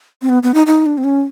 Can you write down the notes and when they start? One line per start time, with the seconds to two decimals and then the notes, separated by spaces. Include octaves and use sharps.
0.22 C4
0.29 B3
0.43 B3
0.54 D#4
0.67 D#4
0.86 D4
0.98 C4
1.04 C#4